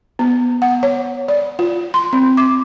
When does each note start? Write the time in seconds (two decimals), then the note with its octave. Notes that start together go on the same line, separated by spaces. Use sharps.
0.19 B3
0.62 F#5
0.83 C#5
1.28 D5
1.59 F4
1.94 C6
2.13 C4
2.37 D6